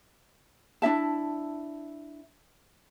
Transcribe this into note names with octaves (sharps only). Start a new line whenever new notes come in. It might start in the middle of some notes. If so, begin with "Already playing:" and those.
D4 E4 E5 A5